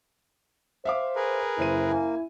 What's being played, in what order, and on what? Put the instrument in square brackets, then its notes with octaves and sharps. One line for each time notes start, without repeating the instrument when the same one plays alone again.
[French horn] C5 [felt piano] E5 F5 D6
[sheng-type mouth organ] G#4 A#4 B4
[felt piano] F#1 C5 D#7 [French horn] E4
[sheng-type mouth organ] A#3 [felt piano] G#5